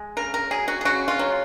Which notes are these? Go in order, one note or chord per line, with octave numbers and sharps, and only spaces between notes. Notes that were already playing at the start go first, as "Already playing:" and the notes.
Already playing: G#3
C#3 A#4
A#4
F#3 G#4
F#4
G#4
C#3 F#4
F4
F#3